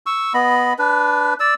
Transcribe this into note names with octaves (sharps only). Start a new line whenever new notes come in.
C#6 E6
B3 D#5 B5
D4 B4
D5 E6